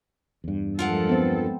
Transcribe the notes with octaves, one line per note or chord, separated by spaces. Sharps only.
E2 G2
F3 G#3 F4 A4 A#4 F#5
B3 C4